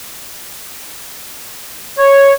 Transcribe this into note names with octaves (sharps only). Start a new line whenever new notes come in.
C#5